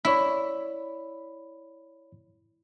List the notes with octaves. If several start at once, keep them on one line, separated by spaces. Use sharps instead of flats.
E4 C#5 D5 B5